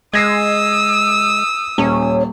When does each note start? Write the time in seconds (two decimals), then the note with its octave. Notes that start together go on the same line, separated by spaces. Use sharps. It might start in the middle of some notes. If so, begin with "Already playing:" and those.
0.13 G#3 D#6 E6 G#6 A#6 C7
1.78 D#1 C#4